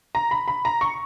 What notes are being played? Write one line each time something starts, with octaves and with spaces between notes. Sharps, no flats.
A#5
B5
B5
A#5
C#6